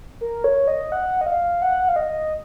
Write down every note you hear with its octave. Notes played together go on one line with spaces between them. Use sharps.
A#4
C#5
D#5
F#5
D#5
F5
F#5
F5
D#5